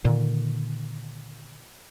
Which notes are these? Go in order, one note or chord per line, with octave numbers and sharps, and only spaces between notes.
A#2 D3 D#3